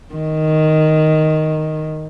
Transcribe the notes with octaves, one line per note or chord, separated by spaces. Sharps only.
D#3